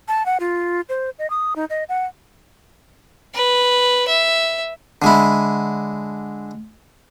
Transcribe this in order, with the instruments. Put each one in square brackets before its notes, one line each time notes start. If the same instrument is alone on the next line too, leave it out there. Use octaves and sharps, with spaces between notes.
[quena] A5
F#5
F4
C5
D#5
D#6
D#4
D#5
F#5
[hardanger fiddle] B4
E5
[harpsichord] D3 G#3 E4